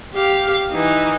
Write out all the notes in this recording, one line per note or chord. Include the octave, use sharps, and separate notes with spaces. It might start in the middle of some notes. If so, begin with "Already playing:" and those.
G4 F5
E3 D#4